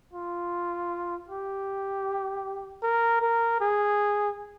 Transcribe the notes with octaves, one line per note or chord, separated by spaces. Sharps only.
F4
G4
A#4
A#4
G#4